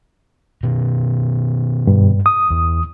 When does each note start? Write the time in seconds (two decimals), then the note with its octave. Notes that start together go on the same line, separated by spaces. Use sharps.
0.63 B2 D#3
1.87 G2
2.26 D#6
2.50 E2